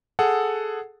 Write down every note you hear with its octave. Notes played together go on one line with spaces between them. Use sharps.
G#4 A4 F#5